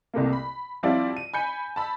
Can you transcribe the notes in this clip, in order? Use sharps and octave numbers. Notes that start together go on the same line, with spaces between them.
C2 C3 A3 A#3
B5
F3 G3 C4 E4 F4 D5
D#7
G#5 B5 G6 C#7
A5 B5 E6